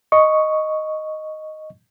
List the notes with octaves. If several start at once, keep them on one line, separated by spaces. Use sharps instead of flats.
D#5 C#6